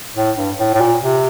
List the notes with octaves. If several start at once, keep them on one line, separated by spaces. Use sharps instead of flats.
A2
G2
A2
A2
A#2
C3